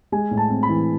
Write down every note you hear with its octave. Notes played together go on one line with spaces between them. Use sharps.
G#3 G#5
A2
A5
C4
B5
E3